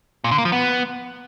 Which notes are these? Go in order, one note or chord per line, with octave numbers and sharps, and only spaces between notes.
A#2
D3
A#3
F3
B3